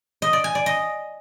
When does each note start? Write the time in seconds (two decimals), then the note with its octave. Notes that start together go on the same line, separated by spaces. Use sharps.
0.22 D#5
0.33 D5
0.44 G#5
0.55 D5
0.66 D#5